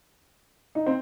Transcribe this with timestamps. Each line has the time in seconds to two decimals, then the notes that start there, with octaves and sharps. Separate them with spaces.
0.75 D#4
0.86 C4